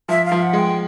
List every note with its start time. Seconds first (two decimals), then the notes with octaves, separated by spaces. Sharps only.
0.09 F3 E5
0.25 F5
0.31 F3
0.42 F#5
0.53 G#3
0.58 G5